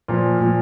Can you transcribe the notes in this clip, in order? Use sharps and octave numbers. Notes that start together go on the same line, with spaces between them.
A#2 F3 A#3
A#2 F3